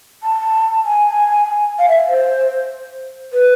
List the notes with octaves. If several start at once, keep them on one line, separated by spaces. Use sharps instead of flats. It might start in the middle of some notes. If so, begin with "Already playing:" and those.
A5
G#5
F5
E5
C5
B4